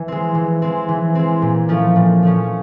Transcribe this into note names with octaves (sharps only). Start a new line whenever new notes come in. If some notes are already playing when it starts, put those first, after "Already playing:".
Already playing: E3
G#3 C4
E3
G#3 C4
E3
G#3 C4
A#2
F3 A3 C#4
A#2
F3 A3 C#4